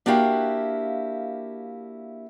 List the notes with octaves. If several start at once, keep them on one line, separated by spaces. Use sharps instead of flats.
A#3 D4 E4 F#4 G4 F5